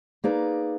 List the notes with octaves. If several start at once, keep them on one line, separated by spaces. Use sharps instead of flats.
A#3 D#4 G#4 B4 D5